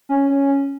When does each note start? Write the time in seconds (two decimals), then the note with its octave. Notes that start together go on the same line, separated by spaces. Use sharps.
0.09 C#4
0.30 C#4